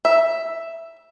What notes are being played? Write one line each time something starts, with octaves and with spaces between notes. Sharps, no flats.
E5